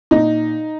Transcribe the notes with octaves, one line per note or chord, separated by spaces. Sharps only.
A#2 D#4